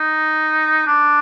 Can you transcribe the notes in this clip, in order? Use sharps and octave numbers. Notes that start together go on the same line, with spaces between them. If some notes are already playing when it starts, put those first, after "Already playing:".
Already playing: D#4
D4